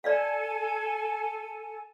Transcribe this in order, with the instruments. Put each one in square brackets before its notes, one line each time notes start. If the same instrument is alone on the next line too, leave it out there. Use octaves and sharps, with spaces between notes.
[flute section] A4 G#5 [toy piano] D5 E5 F5